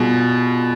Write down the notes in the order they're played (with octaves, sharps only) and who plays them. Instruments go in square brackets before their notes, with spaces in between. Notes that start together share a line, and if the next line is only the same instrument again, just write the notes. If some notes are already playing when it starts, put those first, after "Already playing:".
Already playing: [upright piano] B2 [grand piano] G3 F4 G#4